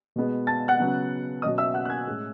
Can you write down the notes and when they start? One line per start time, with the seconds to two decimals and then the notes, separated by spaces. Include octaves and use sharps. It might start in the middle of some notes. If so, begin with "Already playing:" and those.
0.16 B2 G#3 B3
0.47 A5 A6
0.68 F#5 F#6
0.79 C#3 F#3 B3
1.42 B2 F#3 C#4 D#5 D#6
1.58 E5 E6
1.74 F#5 F#6
1.85 F#6
1.90 G#5 G#6
2.06 A2 G#3 C#4